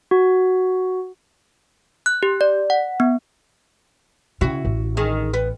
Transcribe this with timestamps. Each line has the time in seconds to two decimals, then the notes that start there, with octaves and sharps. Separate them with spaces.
0.11 F#4
2.06 F#6
2.23 G4
2.41 D5
2.70 F#5
3.00 B3
4.41 C#3 E4 F#4
4.65 A1
4.97 D#3 G#4
5.34 B3